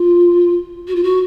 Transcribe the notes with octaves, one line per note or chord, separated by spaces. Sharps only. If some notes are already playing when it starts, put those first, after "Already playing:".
Already playing: F4
F#4
F4
F#4